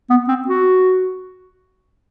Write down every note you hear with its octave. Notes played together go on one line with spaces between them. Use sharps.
B3
C4
F#4